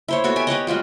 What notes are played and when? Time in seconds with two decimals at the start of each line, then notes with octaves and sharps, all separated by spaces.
0.08 E4 C5 C#5
0.24 B3 F#4 A4 C#5
0.36 G4 E5 G#5
0.47 G4 B4 C#5 D#5
0.67 G3 G#3 F4 F#4